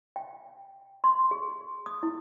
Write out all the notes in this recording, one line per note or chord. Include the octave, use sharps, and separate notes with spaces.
G5
C6
G#4
D#6
E4